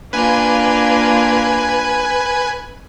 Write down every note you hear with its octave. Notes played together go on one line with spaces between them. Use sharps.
A#3 D4 F4 B4 G#5